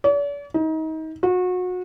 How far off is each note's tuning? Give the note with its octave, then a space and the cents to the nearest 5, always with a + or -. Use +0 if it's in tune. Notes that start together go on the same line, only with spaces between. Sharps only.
D5 -45
D#4 +30
F#4 -30